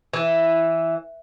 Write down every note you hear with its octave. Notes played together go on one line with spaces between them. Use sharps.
E3